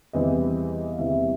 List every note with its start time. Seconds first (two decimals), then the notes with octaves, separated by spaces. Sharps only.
0.13 E2 C3 E3 G3 C4 D#5
0.93 F5
0.98 E2 C3 E3 G3 C4 E5